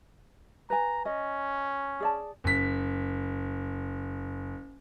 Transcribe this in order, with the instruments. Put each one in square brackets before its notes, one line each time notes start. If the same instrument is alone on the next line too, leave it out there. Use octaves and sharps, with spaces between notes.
[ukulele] B4 G#5 [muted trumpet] A#5
[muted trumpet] C#4 [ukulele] D#5
[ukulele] G#4 D5 A5
[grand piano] F#1 B6